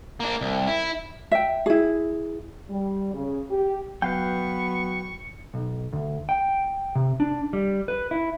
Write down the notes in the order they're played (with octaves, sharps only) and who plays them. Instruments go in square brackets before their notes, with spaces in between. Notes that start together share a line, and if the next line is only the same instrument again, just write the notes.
[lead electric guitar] A#3 D4
C2
E4
[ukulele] E5 G5
E4 G#4
[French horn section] G3
C#3
G4
[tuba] F#3 [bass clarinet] B3 [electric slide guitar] B4 F5 G5 [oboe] C#6
[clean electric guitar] B1
D2
G5
C3
D4
G3
B4
E4